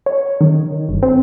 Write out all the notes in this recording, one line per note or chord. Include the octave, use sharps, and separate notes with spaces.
C#5
D#3
G1
C4